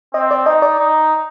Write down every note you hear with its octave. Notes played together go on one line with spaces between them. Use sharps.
C4 D#5
D5
D#4 D#5
D5
D#4